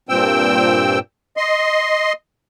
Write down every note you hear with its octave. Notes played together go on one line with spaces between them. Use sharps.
G2 A#2 C4 G5 E6
D#5 C6